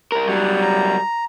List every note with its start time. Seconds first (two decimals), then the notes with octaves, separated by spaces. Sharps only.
0.12 C2 A#4
0.27 C#2 F#3 G3
0.62 A#5